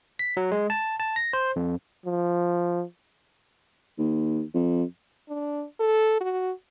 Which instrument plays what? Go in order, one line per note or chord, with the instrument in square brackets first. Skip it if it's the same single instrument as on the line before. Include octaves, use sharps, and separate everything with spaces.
[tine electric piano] B6
F#3
G#3
A5
A5
A#6
C5
F2
[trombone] F3
[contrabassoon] D#2
F2
[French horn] D4
A4
F#4